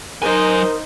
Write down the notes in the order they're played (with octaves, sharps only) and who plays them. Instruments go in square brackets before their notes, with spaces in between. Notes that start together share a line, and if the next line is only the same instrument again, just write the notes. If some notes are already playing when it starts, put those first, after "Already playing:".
[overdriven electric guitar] F#3 G#5 [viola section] D#4 C5 [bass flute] A#4